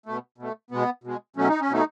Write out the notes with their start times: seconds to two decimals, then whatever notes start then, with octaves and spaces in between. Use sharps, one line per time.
0.06 B2 A3
0.38 B2 A3
0.71 B2 G#3 B3
1.04 B2 G#3
1.36 B2 F#3 A3 C#4
1.48 D#4
1.61 C#4
1.69 B2 F#3 A3 D#4